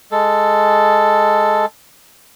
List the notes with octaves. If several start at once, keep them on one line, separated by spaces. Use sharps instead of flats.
G#3 A4